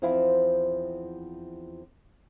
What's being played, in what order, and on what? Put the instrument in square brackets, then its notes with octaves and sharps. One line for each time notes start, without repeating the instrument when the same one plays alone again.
[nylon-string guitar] E2 F3 C4 E4 C5 F5